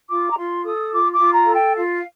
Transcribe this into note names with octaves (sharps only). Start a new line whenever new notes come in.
F4 D6
A#5
F4 C6
A4 D#6
F4 D6
D6
F4
A#5
A4
G5
F4 F5